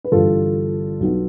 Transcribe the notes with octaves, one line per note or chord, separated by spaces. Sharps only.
B4
G1 G2 E3 F4 A4
B1 B2 B3